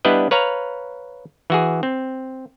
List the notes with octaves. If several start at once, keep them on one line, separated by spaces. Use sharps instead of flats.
G3 B3 D4 E4 B4 D#5
B4 C#5 F5 A#5
E3 F#4 G#4
C4